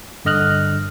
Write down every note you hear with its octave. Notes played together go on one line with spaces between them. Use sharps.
G2 D3 D#5 F6 F#6